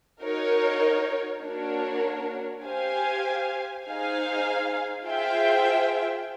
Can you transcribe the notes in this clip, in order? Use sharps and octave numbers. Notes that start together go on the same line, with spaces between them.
D#4 F#4 A#4 C#5
A#3 D4 F#4 A#4 C#5
G4 C5 F5 G#5
D#4 G#4 C5 F5 G#5
F4 G#4 C5 E5 G5